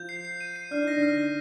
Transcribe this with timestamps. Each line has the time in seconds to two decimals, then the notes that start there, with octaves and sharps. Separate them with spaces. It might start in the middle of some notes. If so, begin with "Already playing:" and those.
Already playing: F3 G6
0.09 C7
0.25 C7
0.41 D#7
0.56 C7
0.71 D4 F6
0.83 D#4 A#6
0.96 D3 D4
1.03 F6
1.18 A#6